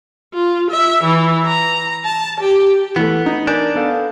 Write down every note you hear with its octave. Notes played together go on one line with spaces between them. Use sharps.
F4
E5
E3
A#5
A5
G4
E3 A3 B3
D#4
D4 A#4 G#5 G6
B3 A4 F5